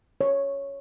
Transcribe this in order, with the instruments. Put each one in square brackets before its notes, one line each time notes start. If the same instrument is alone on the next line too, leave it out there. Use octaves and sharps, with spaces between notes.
[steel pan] C#5